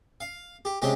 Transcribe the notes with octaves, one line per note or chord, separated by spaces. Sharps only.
F5
G4
C3 G#3 C#4 G4 G5